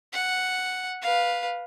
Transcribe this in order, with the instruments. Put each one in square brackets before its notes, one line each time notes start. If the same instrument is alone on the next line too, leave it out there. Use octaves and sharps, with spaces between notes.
[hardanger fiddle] F#5
B4 F5